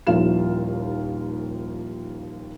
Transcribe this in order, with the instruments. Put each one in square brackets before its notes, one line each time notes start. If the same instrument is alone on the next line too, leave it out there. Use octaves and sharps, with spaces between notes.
[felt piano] D#1 D#2 F3 E4 F4 E7